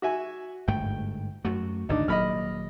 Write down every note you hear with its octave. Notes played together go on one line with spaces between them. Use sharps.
F#4 E5 G#5
G1 G#2 A3 G5
F#2 A3 F#4
G#1 D2 G#2 D4 D#4
D#1 F#3 A#3 D#5 B5 F6